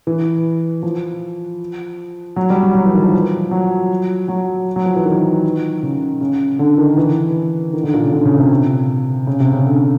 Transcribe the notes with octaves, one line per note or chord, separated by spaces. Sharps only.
E3
F3
F#3
G3
F#3
F#3
E3
D#3
F3
F#3
F#3
F#3
F3
E3
D#3
C#3
C#3
D3
D#3
E3
D#3
D3
A#2
C#3
D3
C#3
C3
C#3
C3
C#3
D3